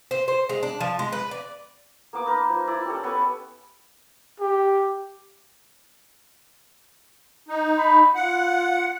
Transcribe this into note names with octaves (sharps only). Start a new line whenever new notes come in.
C5
C5
G#3
D4
F3
G#3
B4
D5
A#3 B3 D6 D#6
D#4 A#4
F3
E4 D5
C#4 G4 A4
B3 B4 C#5
G4
D#4
B5
F4 F#5